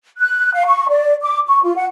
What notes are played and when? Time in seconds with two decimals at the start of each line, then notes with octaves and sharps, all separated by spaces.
0.18 F#6
0.53 F5
0.67 C#6
0.89 D5
1.22 D6
1.48 C#6
1.63 F4
1.77 F#5